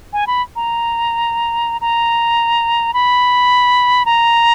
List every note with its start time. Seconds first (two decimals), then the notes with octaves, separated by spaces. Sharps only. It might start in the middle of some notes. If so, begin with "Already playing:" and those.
0.13 G#5
0.27 B5
0.56 A#5
1.81 A#5
2.94 B5
4.06 A#5